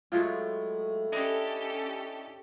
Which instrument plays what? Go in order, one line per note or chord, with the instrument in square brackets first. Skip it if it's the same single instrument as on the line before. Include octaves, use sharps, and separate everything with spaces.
[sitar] A2 [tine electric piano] F#3 G#3 A3 [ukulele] F4
[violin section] C#4 G4 A4 [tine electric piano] D4 E4 D#5